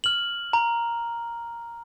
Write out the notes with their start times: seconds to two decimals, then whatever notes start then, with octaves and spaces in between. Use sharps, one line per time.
0.04 F6 F#7
0.53 A#5